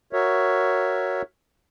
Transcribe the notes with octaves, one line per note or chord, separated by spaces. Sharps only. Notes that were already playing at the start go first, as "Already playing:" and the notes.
F#4 A#4 C#5 E5